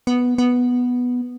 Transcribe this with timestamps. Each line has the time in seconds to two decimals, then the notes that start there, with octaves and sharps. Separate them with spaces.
0.07 B3
0.38 B3